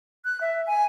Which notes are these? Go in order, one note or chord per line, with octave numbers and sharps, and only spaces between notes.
F#6
E5
G#5